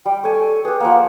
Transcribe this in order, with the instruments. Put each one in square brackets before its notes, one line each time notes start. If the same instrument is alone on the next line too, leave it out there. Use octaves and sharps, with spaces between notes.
[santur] G3 [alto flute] G5
[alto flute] A4 [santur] C#5 G#5
[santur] G4 G#4 [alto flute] B4
[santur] F3 A#3 [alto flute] F#5